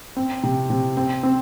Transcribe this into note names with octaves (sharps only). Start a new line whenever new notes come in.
C4
C3
C3
C4
C4